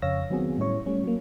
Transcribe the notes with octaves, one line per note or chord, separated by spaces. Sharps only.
F2 C#3 C#5 F5 E6 A#6
D#3 F#3 B3 C4 F#4 G#4
A2 G3 C#4 E4 C#5 C#6
G3 A3 C#4
F#3 A#3